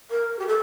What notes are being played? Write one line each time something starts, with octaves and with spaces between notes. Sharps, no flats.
A#4
G4
A4